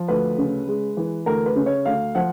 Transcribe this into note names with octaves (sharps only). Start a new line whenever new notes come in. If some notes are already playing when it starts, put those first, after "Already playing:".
Already playing: F3
D2 B4
C#3
G#3
E3
D2 A#4
B4
C#3
C#5
D2 F5
F3 F#5